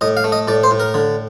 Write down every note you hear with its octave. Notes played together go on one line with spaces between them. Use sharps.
A2 D#5
F5
A3
D#5
A2 D5
C5
A2
A#4
D3